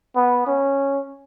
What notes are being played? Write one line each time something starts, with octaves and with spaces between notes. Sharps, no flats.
B3
C#4